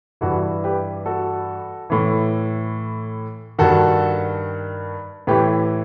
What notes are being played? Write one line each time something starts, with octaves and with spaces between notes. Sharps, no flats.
G2 E3 F#4 A4
G4 B4
F#4 A4
A2 E3
G2 D#3 F#4 A4
A2 E3 G4 B4